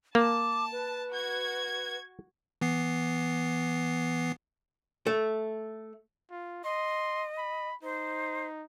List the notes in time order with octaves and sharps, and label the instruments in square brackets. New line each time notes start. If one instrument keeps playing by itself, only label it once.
[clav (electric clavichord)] A#3 [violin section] A5 [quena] D6
[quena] B4
[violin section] F#4 G#6
[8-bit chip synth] E3 B3 C7
[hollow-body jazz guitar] A3
[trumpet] F4
[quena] D#5 [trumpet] C6
[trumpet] B5
[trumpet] D#4 [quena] C5